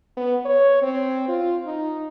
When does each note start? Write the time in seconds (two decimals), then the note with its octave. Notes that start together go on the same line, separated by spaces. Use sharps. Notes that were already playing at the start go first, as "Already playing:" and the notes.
0.17 B3
0.45 C#5
0.82 C4
1.28 F4
1.66 D#4